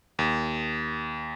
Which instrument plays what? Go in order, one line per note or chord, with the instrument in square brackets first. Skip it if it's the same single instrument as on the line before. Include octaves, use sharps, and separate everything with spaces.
[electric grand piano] D#2